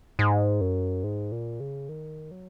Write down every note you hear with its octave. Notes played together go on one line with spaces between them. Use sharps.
G#2
F#2
G#2
A#2
C#3
D#3
F#3